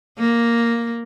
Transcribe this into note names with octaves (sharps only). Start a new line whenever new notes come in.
A#3